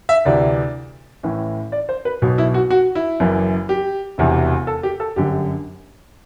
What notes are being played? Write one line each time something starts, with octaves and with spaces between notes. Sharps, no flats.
E5
D2 C3 E3 D5
A1 A2 E3
D5
C5
B4
B1 B2
E4
F#4
F#4
E4
F#1 F#2 E3
G4
E1 E2 C3 E3
A4
G4
A4
G1 F#2 D3 G4